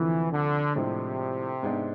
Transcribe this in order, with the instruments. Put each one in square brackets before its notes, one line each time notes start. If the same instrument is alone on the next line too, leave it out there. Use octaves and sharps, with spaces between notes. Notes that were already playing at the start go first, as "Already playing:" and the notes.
Already playing: [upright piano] D2 C3 F3 [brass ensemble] E3
[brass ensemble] D3
[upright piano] A2 F3 G#3 D4 [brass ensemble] C3
[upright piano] G#2 G#3 B3 D4